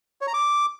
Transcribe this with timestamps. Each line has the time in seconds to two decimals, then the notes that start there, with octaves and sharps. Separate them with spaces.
0.21 C#5
0.27 A#5
0.34 D6